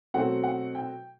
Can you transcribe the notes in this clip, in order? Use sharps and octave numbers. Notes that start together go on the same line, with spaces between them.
B2 F#3 A3 C4 F#5
F#5
G5